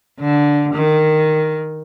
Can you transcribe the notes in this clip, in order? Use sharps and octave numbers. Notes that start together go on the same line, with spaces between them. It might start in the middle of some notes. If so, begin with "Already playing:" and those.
D3
D#3